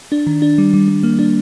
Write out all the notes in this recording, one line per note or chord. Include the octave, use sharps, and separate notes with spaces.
D4
D#3
D4
G3
G3
G3
A#3
D4